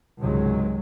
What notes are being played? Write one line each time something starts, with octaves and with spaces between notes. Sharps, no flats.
C#2 G#2 C3 D#3 F#3 G#3